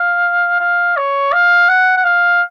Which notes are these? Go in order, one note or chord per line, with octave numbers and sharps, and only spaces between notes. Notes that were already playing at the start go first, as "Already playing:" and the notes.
Already playing: F5
F5
C#5
F5
F#5
F#5
F5